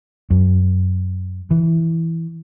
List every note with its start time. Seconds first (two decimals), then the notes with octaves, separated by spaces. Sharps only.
0.30 F#2
1.51 E3